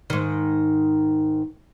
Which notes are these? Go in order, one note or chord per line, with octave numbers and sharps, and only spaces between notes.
G#2 D#3